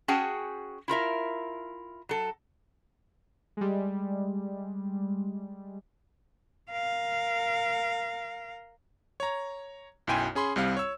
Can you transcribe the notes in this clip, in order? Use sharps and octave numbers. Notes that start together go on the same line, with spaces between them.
C#4 F#4 G#4 F#5 G5 A5
E4 F4 A#4 E5
F#3 A4
G3 G#3
A#4 F5
C#5 A#5
B1 F#2 E4 G5 G#5 C6
C#4 G#4 B5 C6
C2 G3 C4 F5
C#5 E6